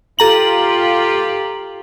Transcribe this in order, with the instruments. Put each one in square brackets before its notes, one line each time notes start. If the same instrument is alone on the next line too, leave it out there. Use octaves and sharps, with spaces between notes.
[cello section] F4 G4 [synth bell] A4 A#5 F#7